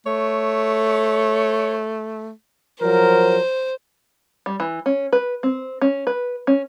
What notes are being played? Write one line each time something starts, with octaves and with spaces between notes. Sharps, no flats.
A3 C#5
F3 F#3 A#4 C5
G3
E3
C#4
B4
C4
C#4
B4
C#4